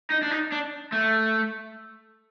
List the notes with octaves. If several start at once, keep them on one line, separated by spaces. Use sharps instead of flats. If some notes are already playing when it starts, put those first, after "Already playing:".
D#4
D4
D#4
D4
A3